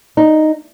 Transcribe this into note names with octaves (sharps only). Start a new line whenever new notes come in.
D#4